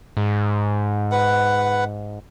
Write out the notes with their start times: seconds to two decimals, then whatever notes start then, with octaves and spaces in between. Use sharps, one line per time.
0.17 G#2
1.12 B4 F#5